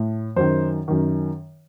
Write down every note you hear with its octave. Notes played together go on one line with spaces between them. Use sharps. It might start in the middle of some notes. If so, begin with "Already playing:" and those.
Already playing: A2
F#2 D#3 C5
F#2 D#3